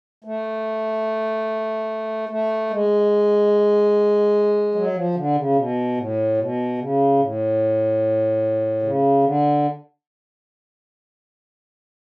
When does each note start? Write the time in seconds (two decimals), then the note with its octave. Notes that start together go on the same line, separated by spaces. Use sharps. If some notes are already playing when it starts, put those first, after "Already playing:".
0.24 A3
2.29 A3
2.70 G#3
4.75 F#3
4.94 F3
5.15 D3
5.36 C#3
5.56 B2
5.97 A2
6.37 B2
6.78 C#3
7.19 A2
8.82 C#3
9.24 D3